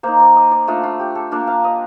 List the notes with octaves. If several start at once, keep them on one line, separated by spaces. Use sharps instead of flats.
A#3 D#4 C5
D5
D#5
D5
A3 D4 F4 D#5
F4
G4
A4
A#3 D4 F4 A#4
F5
D#5